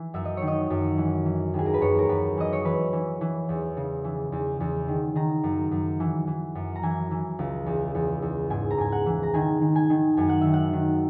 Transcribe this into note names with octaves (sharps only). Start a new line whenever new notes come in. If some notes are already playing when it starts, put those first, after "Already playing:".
Already playing: E3
F#2 E5
D#5
D#3 C#5
D#5
F#2
E3
E3
D#2
G#4
A#4
B4
F#2 C#5
A#4
F#2 B4
E3 D#5
C#5
E3 B4
E3
E3
E2
C#3
E3
E2
E2
D#3
D#3 A#5
F#2
F#2
E3
E3
F#2
A#5
E3 G#5
E3
C#2
E2
E2
E2
G#2 G#5
A#5
G#2 G#5
F#5
E3
A#5
D#3 G#5
D#3
G#5
D#3
F#2 G#5
F#5
D#3 E5
F#5
D#3